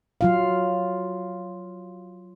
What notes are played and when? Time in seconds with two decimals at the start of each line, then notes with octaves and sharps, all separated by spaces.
0.21 F#3 F4 F5